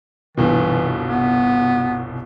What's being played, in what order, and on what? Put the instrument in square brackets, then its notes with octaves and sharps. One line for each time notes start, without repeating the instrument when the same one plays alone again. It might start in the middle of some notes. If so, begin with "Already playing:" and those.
[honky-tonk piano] G1 C2 B2 [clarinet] E3
[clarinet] B3